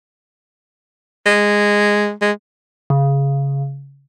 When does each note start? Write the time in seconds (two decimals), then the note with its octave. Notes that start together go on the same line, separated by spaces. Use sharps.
1.26 G#3
2.21 G#3
2.90 C#3